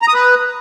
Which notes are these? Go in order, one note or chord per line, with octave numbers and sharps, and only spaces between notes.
A#5
D#6
B4